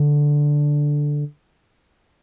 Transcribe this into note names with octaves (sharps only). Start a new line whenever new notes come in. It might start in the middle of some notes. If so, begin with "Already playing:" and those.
Already playing: D3